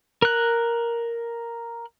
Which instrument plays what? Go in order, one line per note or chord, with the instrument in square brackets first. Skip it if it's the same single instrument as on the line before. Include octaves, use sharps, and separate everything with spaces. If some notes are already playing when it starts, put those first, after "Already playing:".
[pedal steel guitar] A#4 F#6